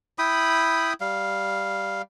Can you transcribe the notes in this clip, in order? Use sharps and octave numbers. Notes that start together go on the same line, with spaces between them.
E4 G5 B5 D#6
G3 F5